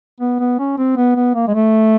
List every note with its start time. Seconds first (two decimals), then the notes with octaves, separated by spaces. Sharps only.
0.20 B3
0.39 B3
0.59 C#4
0.78 C4
0.97 B3
1.16 B3
1.35 A#3
1.48 G#3
1.54 A3